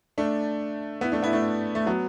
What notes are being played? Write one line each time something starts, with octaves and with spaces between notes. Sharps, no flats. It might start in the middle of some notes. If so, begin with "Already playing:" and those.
A3 D4
B3 E4
A3 D4
B3 E4
A3 D4
A3
F#3 B3